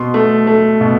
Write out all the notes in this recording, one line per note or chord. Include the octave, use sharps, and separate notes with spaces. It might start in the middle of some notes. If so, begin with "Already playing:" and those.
Already playing: B2 C6
A3
A3
B2